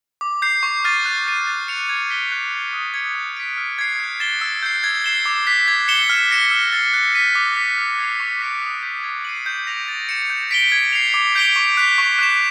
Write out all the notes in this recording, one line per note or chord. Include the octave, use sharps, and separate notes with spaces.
D6
G6 C7
C#6
F6 A6 C7 D#7
F#6
A6 C7 D#7
A6
C#7 F7
G#6
B6 D7 G7
F#6
A6 C7
D#6
G#6 C#7
F#6
B6 D7
F6
G#6 C7
F#6
A6 C7 E7 G7
E6
G6 C7
G#6
C7 E7 G7
D6
F#6 B6
G#6
C#7 E7 G7
F6
A#6 C#7 E7
E6
A6 C7
F#6
B6 D#7
D6
F#6 B6 D#7
F6
G#6 C7 F7
C#6
F#6 B6 D7
D#6
G6 B6
G#6
C7 D#7 F#7
G6
A#6 D7 F7
A6
C#7 E7
G6
B6 D7 G7
G#6
C7 F7
D6
G6 B6 D7 G7
C#6
F#6 B6
C#6
F#6 B6 E7